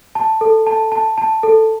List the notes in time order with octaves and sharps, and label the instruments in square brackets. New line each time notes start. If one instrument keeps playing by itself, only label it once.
[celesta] A5
A4
A5
A5
A5
A4